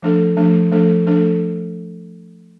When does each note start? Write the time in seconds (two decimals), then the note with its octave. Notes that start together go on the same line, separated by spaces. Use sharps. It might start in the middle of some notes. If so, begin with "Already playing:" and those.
0.02 F3 A3 D4 A4
0.37 F3 A3 D4 A4
0.71 F3 A3 D4 A4
1.07 F3 A3 D4 A4